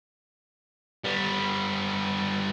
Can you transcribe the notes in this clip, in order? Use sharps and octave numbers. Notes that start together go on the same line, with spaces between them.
G3 B3